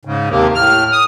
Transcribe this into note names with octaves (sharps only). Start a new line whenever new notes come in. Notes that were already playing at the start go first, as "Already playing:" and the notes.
G#2 C#3
D#2 C3 A#3
A2 F6
D#6